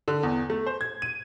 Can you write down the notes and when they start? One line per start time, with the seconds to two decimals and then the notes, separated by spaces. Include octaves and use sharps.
0.08 D3
0.23 E2
0.50 A3
0.66 C5
0.81 G#6
1.02 D#7